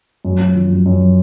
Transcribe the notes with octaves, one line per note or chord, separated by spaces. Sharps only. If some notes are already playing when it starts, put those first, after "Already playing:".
F#2
F#2
F3
F#2
F#2